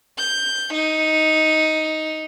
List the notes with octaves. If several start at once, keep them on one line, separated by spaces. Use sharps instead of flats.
G6
D#4